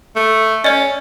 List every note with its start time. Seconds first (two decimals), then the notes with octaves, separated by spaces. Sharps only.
0.16 A3
0.64 C#4 D5 D#5